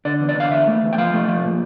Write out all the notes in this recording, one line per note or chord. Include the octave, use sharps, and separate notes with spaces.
D3 D5
E2
D5
D3 F5
E2 E5
A3
E2
G5
F3 F5
A3
F3
A#2